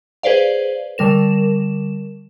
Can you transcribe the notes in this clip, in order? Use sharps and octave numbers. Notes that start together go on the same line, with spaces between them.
G#4 B4 C5 D5 F5
D3 G3 A#4 E7